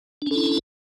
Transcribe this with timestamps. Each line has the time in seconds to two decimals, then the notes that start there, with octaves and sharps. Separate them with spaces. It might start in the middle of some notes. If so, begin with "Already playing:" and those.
0.22 D4
0.26 C#4
0.31 A4
0.36 E4